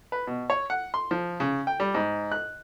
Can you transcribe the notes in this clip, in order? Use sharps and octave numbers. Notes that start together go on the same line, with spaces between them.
B4
B2
C#5
F#5
C6
F3
C#3
G5
G3
G#2
F#6